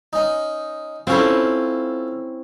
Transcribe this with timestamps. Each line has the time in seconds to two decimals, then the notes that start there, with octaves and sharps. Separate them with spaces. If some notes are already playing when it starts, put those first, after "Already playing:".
0.13 C#4 D#4
1.07 C4 C#4 E4 F4 A4